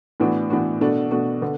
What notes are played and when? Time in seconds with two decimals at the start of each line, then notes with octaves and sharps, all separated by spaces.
0.20 A2 E3 B3 D4 F#4
0.50 A2 E3 B3 D4 F#4
0.81 B2 A3 D4 F#4
1.11 B2 A3 D4 F#4
1.42 D3 B3